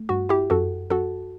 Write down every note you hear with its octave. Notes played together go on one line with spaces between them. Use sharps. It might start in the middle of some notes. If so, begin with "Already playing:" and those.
Already playing: A3
G2 F#4
E4 G4
F#2 F#4 A4
F#2 F#4 A4